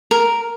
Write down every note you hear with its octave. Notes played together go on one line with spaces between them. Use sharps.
A#4